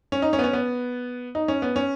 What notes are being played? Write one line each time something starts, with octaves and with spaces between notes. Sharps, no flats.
C#4
D#4
C#4
B3
C#4
B3
D#4
C#4
B3
C#4